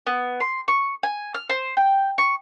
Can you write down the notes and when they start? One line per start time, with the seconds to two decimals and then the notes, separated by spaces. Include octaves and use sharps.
0.07 B3
0.40 C6
0.68 C#6
1.03 G#5
1.34 F6
1.49 C5
1.77 G5
2.18 C#6